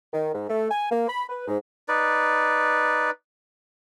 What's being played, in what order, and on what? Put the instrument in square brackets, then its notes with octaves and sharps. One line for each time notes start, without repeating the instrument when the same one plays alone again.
[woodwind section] D#3
G#2
A3
G#5
A#3
B5
B4
G#2
[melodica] D#4 B4 D5